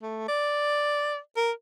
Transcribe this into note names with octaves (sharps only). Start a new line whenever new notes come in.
A3
D5
A#4